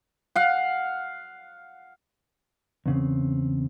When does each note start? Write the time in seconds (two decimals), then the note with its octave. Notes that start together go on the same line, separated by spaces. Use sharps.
0.36 F5 F#5
2.86 E2 C#3 C4